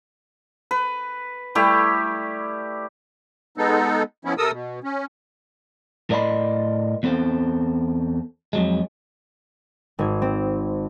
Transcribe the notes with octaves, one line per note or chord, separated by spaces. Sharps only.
B4
G3 A3 E4 G4
G#3 B3 D#4 A4
F3 B3 C#4 E4
C3 A4 A#4 D#6 E6
B2
C#4
A2 A#4 D5 D#5 B5 C6
E2 B3 C4 A4 C5
F2 F#3 G#3
G#1 G#6
C4